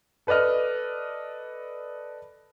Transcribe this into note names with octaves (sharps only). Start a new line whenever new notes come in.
A4 B4 D5 D#5 F6